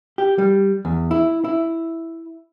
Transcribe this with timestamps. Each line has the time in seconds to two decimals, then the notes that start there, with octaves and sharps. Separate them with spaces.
0.18 G4
0.38 G3
0.85 E2
1.11 E4
1.44 E4